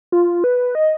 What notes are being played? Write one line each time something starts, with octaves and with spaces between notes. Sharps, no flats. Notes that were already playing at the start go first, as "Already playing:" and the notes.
F4
B4
D#5